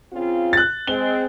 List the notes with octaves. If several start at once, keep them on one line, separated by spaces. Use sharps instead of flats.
C#3 C4 F4
F#6 A6
G#3 C4 G7